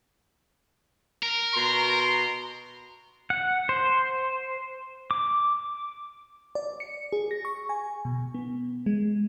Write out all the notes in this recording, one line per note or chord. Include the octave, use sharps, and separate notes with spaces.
A#4
B2 A#5 C6
F#5
C5
D6
D5
C#7
G#4
A#6
C#6
G#5
B2
B3
G#3